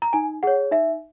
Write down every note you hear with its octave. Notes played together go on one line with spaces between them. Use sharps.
A#5
D#4 G#5
G#4 C#5 F#5
D#4 E5